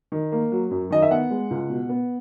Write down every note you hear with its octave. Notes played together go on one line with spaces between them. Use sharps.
D#3
A#3
F#3
F#2
D#3 D#5
E5
B3 F#5
G#3
C#2
B2
B3